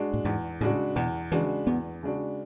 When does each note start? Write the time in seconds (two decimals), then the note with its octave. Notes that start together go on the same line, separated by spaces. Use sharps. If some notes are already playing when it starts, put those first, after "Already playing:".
Already playing: G#3 D4 F#4
0.14 A2
0.25 E2 G#2
0.61 A2 C#3 G#3 D4 F#4
0.96 E2 B2
1.32 C#3 E3 G#3 D4 F#4
1.67 E2 B3
2.03 C#3 G#3 D4 F#4